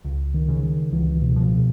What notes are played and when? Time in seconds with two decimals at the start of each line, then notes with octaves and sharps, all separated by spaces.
0.05 C#2
0.34 D#3
0.48 C#3
0.63 D#3
0.93 C#2 E3
1.22 B2
1.36 F3
1.51 B2